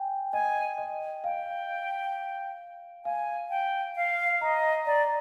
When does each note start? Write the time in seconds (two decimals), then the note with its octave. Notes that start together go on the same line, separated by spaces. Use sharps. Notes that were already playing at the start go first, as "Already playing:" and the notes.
Already playing: G5 G#5
0.33 D#5 G#5
0.78 D#5
1.23 F5 G5
3.05 F5 G#5
3.50 G5
3.96 F5
4.41 D#5 A#5
4.86 D5 A#5